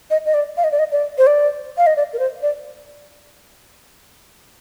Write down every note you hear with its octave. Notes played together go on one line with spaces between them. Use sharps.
D#5
D#5
D5
F5
D#5
D5
D#5
D5
C5
D5
F5
D#5
D5
A#4
C5
D5